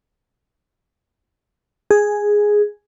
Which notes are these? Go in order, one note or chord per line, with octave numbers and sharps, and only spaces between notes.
G#4